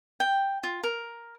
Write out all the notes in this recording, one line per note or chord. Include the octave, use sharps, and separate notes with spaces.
G5
F4
A#4